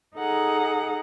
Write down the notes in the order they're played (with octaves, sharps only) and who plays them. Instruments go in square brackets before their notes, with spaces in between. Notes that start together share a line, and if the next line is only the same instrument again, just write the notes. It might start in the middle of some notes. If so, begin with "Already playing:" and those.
[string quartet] D#4 G#4 A4 F#5 A#5